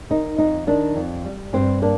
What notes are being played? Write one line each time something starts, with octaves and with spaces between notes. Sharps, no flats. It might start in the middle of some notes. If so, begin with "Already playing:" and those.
D#3 D#4
F2 D#4
D#3 D4
F2
G3
G2 C4
A#3 D4